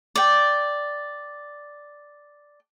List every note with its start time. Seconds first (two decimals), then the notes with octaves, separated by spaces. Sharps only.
0.16 D5 G5